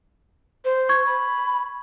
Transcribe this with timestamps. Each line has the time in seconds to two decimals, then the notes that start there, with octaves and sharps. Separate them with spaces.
0.65 C5
0.89 C#6 G#6
1.06 B5